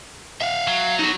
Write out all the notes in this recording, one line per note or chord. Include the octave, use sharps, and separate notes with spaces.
E5 F5
F#3
D#4 F#4